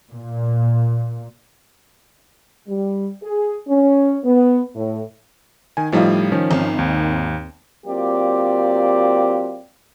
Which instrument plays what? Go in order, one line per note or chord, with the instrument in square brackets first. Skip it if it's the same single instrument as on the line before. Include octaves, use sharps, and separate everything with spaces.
[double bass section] A#2
[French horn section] G3
G#4
C#4
B3
A2
[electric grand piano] D#3 G#5
[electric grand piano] A2 G3 [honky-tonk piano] F3 D#4 F4
[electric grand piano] D#3 F3 C#4
[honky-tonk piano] G#1
[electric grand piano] D#2
[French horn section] F#3 A#3 C4 F4 G4 D5